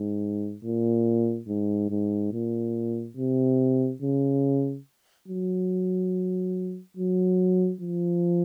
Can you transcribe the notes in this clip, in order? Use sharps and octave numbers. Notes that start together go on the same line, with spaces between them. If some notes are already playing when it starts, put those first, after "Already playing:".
Already playing: G#2
A#2
G#2
G#2
A#2
C3
C#3
F#3
F#3
F3